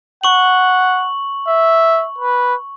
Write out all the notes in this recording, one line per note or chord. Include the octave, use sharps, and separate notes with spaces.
F#5 C#6 F#7
E5
B4